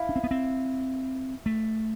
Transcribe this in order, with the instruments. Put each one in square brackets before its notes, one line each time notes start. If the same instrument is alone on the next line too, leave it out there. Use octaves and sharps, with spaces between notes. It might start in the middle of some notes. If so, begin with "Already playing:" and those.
Already playing: [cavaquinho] E4 F5
[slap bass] D4
C4
B3
C4
A3